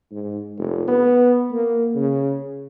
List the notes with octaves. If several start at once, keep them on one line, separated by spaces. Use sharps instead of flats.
G#2
F1
B3
A#3
C#3